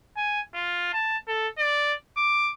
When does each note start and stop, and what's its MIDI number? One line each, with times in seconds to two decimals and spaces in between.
0.17 0.41 80
0.55 0.92 65
0.93 1.17 81
1.28 1.48 69
1.58 1.94 74
2.17 2.52 86